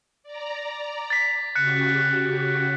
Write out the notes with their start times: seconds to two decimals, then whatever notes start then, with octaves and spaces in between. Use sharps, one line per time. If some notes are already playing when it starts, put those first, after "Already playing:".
0.23 D5 A#5
1.10 A6 B6
1.55 C#3 F#4 G4 F#6 C#7